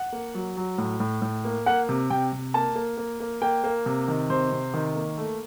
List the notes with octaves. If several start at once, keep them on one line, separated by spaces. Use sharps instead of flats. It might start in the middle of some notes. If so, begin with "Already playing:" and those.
Already playing: F#5
A#3
F#3
F#3
A2
A2
A2
A#3
A#3 F#5
C3
C3 G5
C3
A#3 A5
A#3
A#3
A#3
A#3 G5
A#3
C3
D#3
C3 C5
C3
D#3
A#3
A3